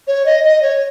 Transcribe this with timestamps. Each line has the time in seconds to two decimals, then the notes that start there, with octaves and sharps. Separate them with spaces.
0.07 C#5
0.26 D#5
0.44 D#5
0.63 C#5